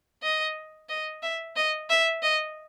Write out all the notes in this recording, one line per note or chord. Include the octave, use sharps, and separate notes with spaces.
D#5
D#5
E5
D#5
E5
D#5